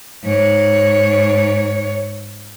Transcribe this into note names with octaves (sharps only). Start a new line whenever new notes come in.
G#2 C#5